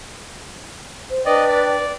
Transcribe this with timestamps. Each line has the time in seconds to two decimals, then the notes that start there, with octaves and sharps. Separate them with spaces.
1.10 C5
1.26 D4 B4 D5 D#5 G5
1.48 D5